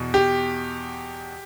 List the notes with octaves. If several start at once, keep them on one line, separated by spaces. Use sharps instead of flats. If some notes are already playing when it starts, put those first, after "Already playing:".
Already playing: E2 B2
G4